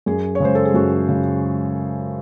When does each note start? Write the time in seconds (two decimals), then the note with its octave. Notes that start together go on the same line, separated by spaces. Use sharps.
0.06 F#2 G#4
0.35 C#5
0.40 C#3 G#3 C5
0.55 A4
0.65 G#4
0.74 F#2 F#4
1.08 C#3 G#3